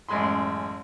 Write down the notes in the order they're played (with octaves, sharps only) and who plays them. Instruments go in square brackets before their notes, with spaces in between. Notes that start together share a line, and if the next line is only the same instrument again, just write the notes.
[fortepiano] A1 F#2 G#3 B5 C6